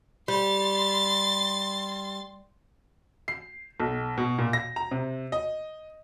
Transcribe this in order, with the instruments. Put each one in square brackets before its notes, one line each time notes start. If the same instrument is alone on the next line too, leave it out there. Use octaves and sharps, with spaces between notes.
[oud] G3 [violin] C6 A6
[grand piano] C7
B1
B2
A#2
A#6
A#5
C3
D#5